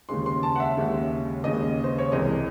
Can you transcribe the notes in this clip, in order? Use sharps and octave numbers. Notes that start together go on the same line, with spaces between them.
D#2 C#3 G#3 C6
C6
A5
F#5
E5
D#2 C#3 G#3
D#2 C#3 G#3 D#5
C5
C#5
C2 C3 E3 G#3 D#5